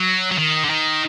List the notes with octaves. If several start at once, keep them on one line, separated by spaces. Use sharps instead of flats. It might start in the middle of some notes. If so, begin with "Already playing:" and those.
Already playing: F#3
F#3
D#3
D3
D#3